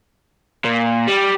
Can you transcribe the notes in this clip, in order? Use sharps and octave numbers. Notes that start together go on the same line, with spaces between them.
A#2
G3